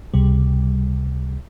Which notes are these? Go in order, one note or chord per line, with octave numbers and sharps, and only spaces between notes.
C#2 C3 G3